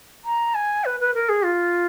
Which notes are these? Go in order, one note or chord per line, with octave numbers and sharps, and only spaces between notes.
A#5
G#5
B4
B4
A#4
G#4
F4